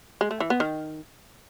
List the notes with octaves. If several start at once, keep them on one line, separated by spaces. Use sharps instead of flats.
G#3
A3
E3
B3
D#3